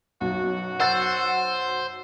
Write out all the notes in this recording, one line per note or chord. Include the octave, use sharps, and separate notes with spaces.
B1 F#2 B2 F#4
C5 F#5 E6 A6